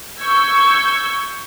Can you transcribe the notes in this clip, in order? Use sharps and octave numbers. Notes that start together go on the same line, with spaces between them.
C#6 E6 G6 G#6